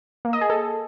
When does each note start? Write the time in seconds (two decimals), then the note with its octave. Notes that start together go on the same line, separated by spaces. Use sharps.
0.25 A#3
0.33 D#5
0.41 G#4
0.50 A4